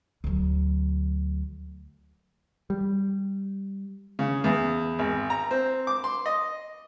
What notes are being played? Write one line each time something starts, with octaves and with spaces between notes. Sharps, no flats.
D2 F#3
G3
C#3
E2
G#1
A#5
C4
D6
C6
D#5